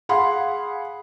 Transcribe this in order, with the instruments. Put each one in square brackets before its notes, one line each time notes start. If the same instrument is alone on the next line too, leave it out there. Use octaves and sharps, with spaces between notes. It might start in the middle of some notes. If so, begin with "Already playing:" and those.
[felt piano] G#4 F5 F#5 B5 C6